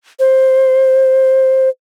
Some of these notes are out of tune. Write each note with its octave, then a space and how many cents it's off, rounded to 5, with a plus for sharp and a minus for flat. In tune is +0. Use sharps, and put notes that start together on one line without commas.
C5 +10